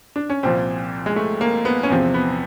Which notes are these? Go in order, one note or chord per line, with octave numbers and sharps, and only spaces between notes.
D4
C#4
C2 A#2 F3 C4
G#3
A3
A#3
B3
C#4
E2 C3 F3 C4
B3